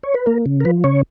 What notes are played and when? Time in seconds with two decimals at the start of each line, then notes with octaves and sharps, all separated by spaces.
0.03 C#5
0.14 B4
0.26 A#3 A#4
0.46 C#3
0.60 A#4
0.65 F3 B4
0.84 C#3 C#5